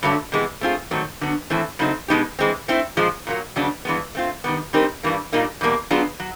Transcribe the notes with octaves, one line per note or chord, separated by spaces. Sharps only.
G2 D3 F#3 A3
C3 E3 G#3 B3
A3 C4 F4 G#4
G#2 D#3 F#3 A3 C4
D3 F#3 B3
A2 E3 A3 C4 E4
C#3 F#3 A3 C4 D#4
B2 G#3 B3 D#4 G4
E3 G#3 C4
A3 C4 E4
A#2 F3 G#3
A#2 F#3 A#3
F2 C#3 F#3 B3 D4
G2 E3 G#3 B3
A3 C4 F4
D#3 G3 B3
G3 C4 D#4 G4 A#4
G2 E3 G3 A#3
A#2 G3 A#3 D#4
E2 B2 G3 A#3
F#3 B3 D4 F4 G#4
F#3